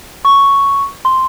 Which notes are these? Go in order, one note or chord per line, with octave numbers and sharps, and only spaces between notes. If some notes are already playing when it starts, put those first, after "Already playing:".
C#6
C6